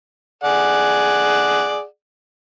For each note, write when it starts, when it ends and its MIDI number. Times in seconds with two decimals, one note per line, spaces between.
0.44 1.84 68
0.44 1.84 74
0.44 1.84 78